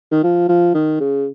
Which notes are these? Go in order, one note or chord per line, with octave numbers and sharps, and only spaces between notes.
D#3
F3
F3
D#3
C#3